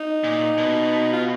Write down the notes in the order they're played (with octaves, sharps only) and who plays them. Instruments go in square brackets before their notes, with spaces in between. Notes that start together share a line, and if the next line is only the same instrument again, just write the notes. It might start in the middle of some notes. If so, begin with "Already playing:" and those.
Already playing: [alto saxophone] D#4
[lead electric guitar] A#2
B2
[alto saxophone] F4